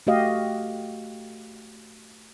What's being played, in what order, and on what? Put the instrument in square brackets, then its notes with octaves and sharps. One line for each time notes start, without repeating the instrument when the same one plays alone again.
[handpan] A3 F#4 G4 D#5 F5